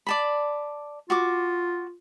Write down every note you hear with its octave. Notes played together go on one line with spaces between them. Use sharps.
D5 A5 B5
F4 F#4 C#6 D6